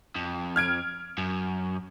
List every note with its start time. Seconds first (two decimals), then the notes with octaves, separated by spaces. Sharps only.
0.15 F2
0.56 F6 G#6 D7
1.18 F#2